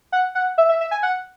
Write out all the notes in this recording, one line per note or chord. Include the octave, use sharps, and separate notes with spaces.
F#5
F#5
E5
E5
E5
G#5
F#5